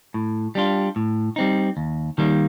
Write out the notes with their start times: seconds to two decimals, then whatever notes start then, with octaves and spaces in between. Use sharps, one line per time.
0.14 A2
0.55 G3 D4 F4
0.96 A2
1.36 G3 C4 D#4
1.77 D#2
2.18 D#3 G3 A#3